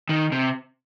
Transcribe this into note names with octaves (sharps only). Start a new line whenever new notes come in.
D#3
C3